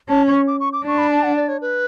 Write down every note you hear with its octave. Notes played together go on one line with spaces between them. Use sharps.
C#4 A5
C#6
D6
C#6
D6
D4 C#6
B5
A5
F#5
D5
C#5
B4